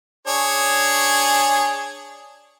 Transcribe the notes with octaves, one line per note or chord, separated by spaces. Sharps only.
D4 G#4 C#5